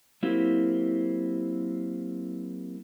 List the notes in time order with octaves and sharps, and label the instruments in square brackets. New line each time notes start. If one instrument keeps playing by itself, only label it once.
[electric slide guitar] F#3 A#3 C4 E4 G4